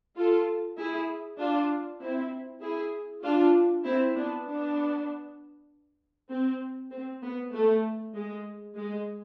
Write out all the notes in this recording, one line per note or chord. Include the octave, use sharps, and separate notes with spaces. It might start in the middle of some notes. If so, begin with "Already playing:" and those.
F4 A4
E4 G#4
D4 F4
C4 E4
E4 G#4
D4 F4
C4 E4
B3 D4
B3 D4
C4
C4
B3
A3
G#3
G#3